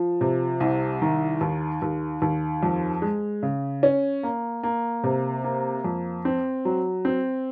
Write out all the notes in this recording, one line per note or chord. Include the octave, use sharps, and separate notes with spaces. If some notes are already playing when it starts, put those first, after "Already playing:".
Already playing: F3
C3
C2
D#3
D#2
D#2
D#2
F2
G#3
C#3
C#4
A#3
A#3
C3
A#3
F2
C4
F#3
C4